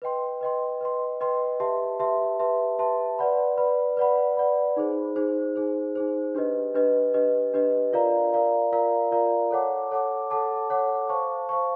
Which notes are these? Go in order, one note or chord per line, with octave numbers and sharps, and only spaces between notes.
B4 D#5 G5 C6
B4 D#5 G5 C6
B4 D#5 G5 C6
B4 D#5 G5 C6
G4 B4 E5 A5 C6
G4 B4 E5 A5 C6
G4 B4 E5 A5 C6
G4 B4 E5 A5 C6
B4 D5 F#5 B5
B4 D5 F#5 B5
B4 D5 F#5 B5
B4 D5 F#5 B5
D#4 G#4 C5
D#4 G#4 C5
D#4 G#4 C5
D#4 G#4 C5
D4 G4 B4 D#5
D4 G4 B4 D#5
D4 G4 B4 D#5
D4 G4 B4 D#5
F4 A#4 D5 F5 A#5
F4 A#4 D5 F5 A#5
F4 A#4 D5 F5 A#5
F4 A#4 D5 F5 A#5
A4 C#5 F#5 A5 D6
A4 C#5 F#5 A5 D6
A4 C#5 F#5 A5 D6
A4 C#5 F#5 A5 D6
C5 F5 A5 C#6
C5 F5 A5 C#6